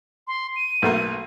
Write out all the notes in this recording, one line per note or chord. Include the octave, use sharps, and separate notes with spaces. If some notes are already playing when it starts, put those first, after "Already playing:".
C6
D#7
B1 A3 A#3